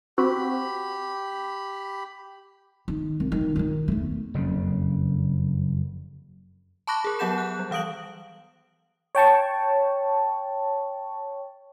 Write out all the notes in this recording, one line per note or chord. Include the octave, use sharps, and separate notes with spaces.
C4 F#4 G4 B5
D#3
C2
D#3
D#3 D#4
E2 A3
F#1 F2 C#3
A5 B5 C#6 D6 F#6 A#6
G#4 A#4
F#3 B3 G4 F#5 G6 E7
F#6
G3
E3 F5 D#6 D7 F#7
C#5 G5 A5 C#6